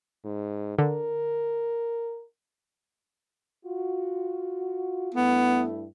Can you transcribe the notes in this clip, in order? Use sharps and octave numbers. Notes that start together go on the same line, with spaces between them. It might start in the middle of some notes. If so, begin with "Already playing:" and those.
G#2
D3 A#4
F4 F#4
G2 A3 B3 E4